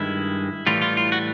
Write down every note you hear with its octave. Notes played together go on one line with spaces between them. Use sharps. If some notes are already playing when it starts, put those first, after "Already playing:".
Already playing: G2 D#3 G#3 E4
A2 E3 G3 F4
F4
F4
F#4